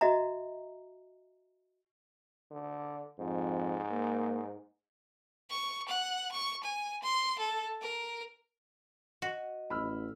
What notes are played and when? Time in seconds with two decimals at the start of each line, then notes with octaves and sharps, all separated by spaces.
0.01 F#4 D#5 E5 A#5
2.51 D3
3.19 F2 G#2
3.91 A#3
5.50 C#6
5.88 F#5
6.32 C#6
6.64 G#5
7.03 C6
7.39 A4
7.82 A#4
9.22 F#4 D#5
9.70 A1 B5 E6 F6